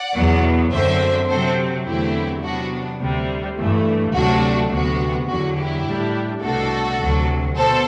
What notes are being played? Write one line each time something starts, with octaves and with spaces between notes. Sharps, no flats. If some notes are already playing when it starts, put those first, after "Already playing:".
Already playing: D5 F#5
E2 B2 F#3 B3
F#2 D3 F#3 C4 C5 E5
C3 F#3 C4 A4 C5
E2 D3 F#3 A3 C4 E4 G4
C3 F#3 B3 D4 F#4
D2 C3 G3
G2 E3 A3
D2 C3 F#3 A3 D4 F#4
D2 C3 F#3 B3 F#4
E2 D3 F#3 F#4
E4 G4
A2 G3 D4
C2 B2 A3 D4 F#4 A4
D2 C3 F#3
B2 A4 C5